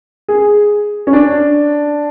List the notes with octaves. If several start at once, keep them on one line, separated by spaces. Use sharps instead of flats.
G#4
C#4
D4